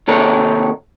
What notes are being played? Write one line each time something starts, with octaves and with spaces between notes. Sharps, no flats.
D#2 C3 A4 A#4 C#5